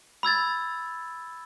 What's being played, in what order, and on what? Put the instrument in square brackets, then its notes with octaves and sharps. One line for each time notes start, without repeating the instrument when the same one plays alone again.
[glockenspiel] B5 E6 G#6 A6